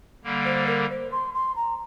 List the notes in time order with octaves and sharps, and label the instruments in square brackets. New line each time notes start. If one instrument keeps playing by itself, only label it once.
[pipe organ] D3 G3 A#3
[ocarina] C5
A#4
C5
C6
C6
A#5